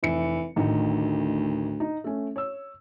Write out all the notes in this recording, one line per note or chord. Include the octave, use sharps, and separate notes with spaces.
F1 E3 E5 C#7
A1 D2 D#3 D#4
D#4
A3 C#4
C#5 E6